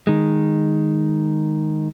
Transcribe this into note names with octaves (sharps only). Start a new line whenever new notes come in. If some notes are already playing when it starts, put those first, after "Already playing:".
D#3 G#3